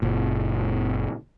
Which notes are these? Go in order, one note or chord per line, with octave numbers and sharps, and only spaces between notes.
F#1 A#2